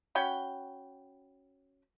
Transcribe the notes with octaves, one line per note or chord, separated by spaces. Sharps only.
C#4 F#4 G5 B5